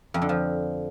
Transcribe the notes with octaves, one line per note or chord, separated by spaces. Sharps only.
F2
D3
F3